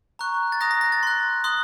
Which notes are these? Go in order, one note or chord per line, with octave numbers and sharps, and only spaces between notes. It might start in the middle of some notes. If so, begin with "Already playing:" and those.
A#5 C#6 F#6
A6
A#5 D#6 F#6 A#6
A#6
A#6
A6
C6 F#6
C6 D#6 F#6